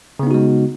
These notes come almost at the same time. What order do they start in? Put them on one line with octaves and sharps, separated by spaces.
C#3 B3 D#4 F#4 G#3